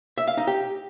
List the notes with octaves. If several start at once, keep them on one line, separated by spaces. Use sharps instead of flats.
E5
F5
D#4
G4